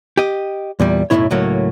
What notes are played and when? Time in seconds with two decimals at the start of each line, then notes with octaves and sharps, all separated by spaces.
0.17 G4 D#5
0.80 E2 A#2 G3
1.10 B1 F#2 A2 C3 E4 C#5
1.31 C#2 A2 F#3 A#3